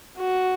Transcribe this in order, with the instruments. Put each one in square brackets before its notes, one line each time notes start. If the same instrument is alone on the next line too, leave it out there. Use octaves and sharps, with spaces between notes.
[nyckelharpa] F#4